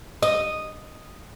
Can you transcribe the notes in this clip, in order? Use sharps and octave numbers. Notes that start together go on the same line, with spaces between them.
D#5 D#6